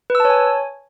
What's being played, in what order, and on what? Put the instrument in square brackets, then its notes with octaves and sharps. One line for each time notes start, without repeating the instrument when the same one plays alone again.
[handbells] B4
E6
A5
C#5
G#5